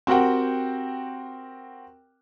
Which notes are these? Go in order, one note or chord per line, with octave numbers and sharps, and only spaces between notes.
C4 F#4 G4 A#4 F#5 G5